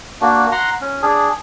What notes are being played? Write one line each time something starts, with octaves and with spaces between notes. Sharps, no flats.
A#3 D4 F#4
F#5 A#5 C6
C#4
D4 G#4